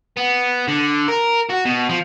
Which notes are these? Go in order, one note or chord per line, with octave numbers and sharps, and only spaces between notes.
B3
D3
A#4
F#4
B2
F3